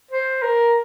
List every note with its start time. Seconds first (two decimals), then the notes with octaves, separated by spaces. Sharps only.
0.11 C5
0.43 A#4